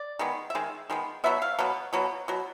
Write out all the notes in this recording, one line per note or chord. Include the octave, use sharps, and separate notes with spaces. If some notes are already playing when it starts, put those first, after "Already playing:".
Already playing: D5
D#3 G#3 B3
E5
D#3 G#3
D#3 G#3 B3
B2 F#3 B3 E5
F5
B2 F#3 B3
B2 F#3 B3
B2 F#3